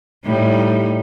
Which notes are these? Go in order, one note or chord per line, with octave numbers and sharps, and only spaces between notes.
A2 G3 D#4